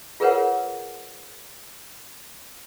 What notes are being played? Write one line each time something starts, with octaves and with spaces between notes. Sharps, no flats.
F4 G#4 A#4 B4 C#5 F#5